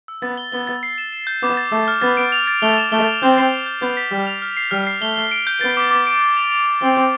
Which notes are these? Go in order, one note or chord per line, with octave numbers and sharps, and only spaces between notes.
E6
B3 A6
G7
B3 G7
A6
C7
E7
E7
G6
B3 D6
A6
A3 D6
F6
B3 A6
D7
F7
A6
A3 G7
E7
A3 G7
A6
C4 G6
C7
C7
G6
B3 G6
B6
G3 B6
F7
F6
C7
G3 F6
C7
A3 G7
G7
D7
G6
B3 A6
D6
D6
D7
G6
F7
F7
F7
C4 G7
G6